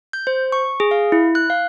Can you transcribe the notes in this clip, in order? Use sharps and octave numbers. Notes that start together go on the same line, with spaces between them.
G6
C5
C#6
G#4
F5
E4
F#6
F5